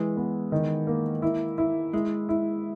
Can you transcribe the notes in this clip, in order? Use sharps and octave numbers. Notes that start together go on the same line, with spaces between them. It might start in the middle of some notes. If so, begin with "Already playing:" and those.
Already playing: E3 G#3
B3
D#3
A#3
E4
E4
G#3 E4
E4